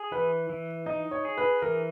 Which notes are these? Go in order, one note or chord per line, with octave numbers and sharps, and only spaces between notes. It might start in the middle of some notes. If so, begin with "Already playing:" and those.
Already playing: G#4
E3 B4
E3
D#4 D#5
C#5
G#4
B4
E3 A#4